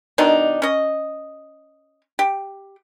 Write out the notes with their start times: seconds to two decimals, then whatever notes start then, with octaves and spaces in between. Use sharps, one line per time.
0.18 B2 D#3 D4 D#4
0.62 C#4 D#5
2.19 G4